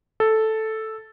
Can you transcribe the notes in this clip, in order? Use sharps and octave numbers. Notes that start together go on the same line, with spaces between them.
A4